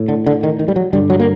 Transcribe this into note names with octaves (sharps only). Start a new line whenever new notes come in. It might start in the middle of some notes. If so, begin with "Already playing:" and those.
Already playing: A2
D3
D3
D#3
D#3
G3
F#3
G2 D3 G3
F#3
A#3